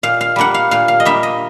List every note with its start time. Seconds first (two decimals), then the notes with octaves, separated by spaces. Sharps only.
0.03 A#2 F5
0.21 F5
0.36 G3 A#3 D4 F#5
0.54 F5
0.71 A#2 F5
0.88 F5
1.00 D#5
1.05 G3 A#3 D4 E5
1.23 D#5